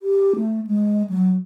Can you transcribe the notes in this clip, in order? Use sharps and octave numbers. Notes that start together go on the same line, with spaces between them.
G4
A3
G#3
F#3